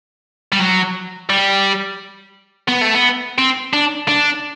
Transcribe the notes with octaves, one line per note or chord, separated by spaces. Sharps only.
G3
F#3
G3
B3
A3
B3
C4
D4
D4